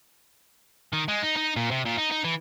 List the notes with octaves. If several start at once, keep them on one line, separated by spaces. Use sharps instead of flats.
D#3
G#3
D#4
D#4
A#2
C3
A#2
D#4
D#4
E3